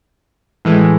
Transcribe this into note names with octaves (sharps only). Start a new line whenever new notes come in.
A2 E3 G#3